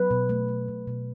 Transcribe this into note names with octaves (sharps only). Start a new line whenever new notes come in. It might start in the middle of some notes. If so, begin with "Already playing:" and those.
Already playing: F#3 B4
B2
A3
A3
B2
B2